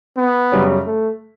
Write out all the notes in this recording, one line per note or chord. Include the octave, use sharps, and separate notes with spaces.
B3
F#2 C#3 G3 C#4
A3